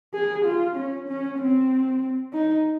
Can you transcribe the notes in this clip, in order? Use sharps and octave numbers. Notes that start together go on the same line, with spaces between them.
G#4
F4
C#4
C#4
C4
D#4